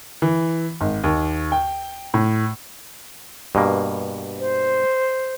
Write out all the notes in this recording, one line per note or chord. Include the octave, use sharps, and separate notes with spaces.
E3
G#1
D#2
G5
A2
G2 B2 A#3
C5